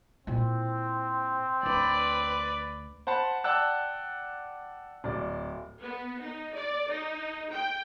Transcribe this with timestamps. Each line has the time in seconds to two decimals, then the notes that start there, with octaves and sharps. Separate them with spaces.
0.27 A#2 C4 E4
1.63 D2 D4 B4 D5
3.07 C5 F#5 A5 B5
3.44 D5 F#5 G5 A5 E6 F#6
5.04 D1 D5
5.81 B3
6.22 D#4
6.54 D5
6.90 D#4
7.52 G5